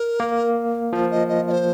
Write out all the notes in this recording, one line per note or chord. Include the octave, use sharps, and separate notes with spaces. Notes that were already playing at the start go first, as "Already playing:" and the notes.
Already playing: A#4
A#3
F3 C5
D#5
D#5
D#5
C5